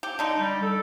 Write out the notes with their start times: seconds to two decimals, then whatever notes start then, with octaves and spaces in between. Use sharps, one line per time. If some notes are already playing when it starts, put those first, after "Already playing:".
0.03 G4
0.19 D3 D4 D#4
0.39 G3
0.62 A4